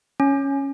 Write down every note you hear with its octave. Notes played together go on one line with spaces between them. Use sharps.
C#4